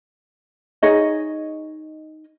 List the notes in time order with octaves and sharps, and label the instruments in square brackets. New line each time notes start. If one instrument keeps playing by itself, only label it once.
[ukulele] D#4 G#4 C#5 D#5